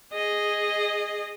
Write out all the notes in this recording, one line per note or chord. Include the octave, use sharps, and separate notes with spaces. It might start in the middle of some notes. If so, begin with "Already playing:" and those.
G#4 D#5